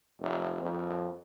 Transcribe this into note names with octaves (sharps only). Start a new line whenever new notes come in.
F1
F2